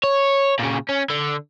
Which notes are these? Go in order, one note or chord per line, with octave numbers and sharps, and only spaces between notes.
C#5
A#2 C#3
C#4
D3